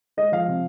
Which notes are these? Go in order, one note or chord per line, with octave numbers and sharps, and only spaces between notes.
G#3 D#5
F3 F5
C3